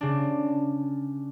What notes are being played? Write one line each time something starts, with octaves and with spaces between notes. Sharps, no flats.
C#3 D4